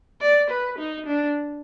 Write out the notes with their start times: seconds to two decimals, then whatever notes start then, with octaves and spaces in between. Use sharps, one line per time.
0.21 D5
0.50 B4
0.78 D#4
1.06 D4